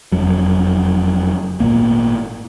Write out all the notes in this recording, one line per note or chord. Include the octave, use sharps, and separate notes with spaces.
F#1 F2 F#3
G#1 F#2 A#2 A#3